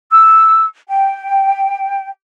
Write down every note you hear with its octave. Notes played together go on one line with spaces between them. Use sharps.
E6
G5